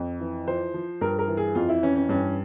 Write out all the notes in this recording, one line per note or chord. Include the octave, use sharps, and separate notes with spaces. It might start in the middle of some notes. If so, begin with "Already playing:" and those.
Already playing: F2
E3
F3 C5
F3
G2 A#4
A#4
E3
G#4
F2 F4
E4
E3 C#4
C#4
G2 C#4